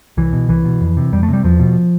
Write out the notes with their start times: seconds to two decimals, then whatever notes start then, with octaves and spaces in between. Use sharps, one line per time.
0.17 C2 E3
0.33 B2
0.48 C2 E3
0.65 B2
0.81 F2
0.97 C3
1.13 F2 G3
1.23 A3
1.29 C3 G3
1.44 E2 F3
1.60 B2